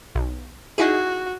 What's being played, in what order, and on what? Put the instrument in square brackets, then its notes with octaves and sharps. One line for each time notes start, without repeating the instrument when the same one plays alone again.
[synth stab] B1
[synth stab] D#4 E4 G#4 [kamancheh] F#4